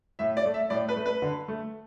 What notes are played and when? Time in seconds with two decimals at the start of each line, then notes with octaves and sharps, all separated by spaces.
0.19 A2 E5
0.37 D5
0.45 A3
0.54 E5
0.70 A2 D5
0.89 B4
0.96 A3
1.06 B4
1.22 D3
1.48 A3